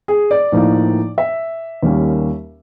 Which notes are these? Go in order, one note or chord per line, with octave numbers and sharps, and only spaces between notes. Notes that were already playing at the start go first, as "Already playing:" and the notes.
G#4
D5
A2 F3 A#3 D#4
E5
D#2 D#3 G3 A#3 C#4